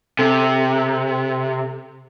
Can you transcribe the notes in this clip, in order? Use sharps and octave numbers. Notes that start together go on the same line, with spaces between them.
C3 A4